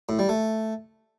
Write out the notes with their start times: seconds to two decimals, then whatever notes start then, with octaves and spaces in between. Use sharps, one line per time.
0.09 A2
0.19 G3
0.29 A3